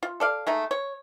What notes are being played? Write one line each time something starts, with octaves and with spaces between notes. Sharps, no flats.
F4
A4 D5 F5
G#3 A3 D#4
C#5